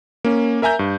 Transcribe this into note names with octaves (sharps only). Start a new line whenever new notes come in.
A#3 C#4
A#4 E5 G#5 A#5 G6
G2